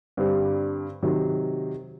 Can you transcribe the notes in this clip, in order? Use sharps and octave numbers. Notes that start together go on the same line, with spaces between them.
G2 D3 G3 C4
C3 D#3 F#3